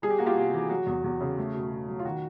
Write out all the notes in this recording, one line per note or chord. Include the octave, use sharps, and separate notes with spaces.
G3 G#4
G4
A#3 F#4
F4 G4
C3
E3
F#3 F#4
E2
E2
C#3
A3
B2
B2
F#3
F4
D#3 F#4